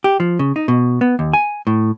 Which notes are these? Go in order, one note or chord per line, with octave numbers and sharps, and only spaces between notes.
G4
F3
C#3
D#4
B2
B3
D#2
G#5
A2